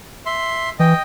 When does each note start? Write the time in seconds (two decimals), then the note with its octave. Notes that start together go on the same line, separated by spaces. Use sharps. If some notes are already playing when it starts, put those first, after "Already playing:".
0.26 E5 C6
0.79 E3 D#5 G5